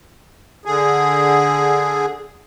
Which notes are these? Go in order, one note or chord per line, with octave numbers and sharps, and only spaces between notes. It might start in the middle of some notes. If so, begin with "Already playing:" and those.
D3 G#4